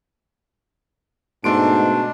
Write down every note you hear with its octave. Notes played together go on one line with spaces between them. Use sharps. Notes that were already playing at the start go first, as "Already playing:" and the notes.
G#2 B2 A3 D4 C6 D7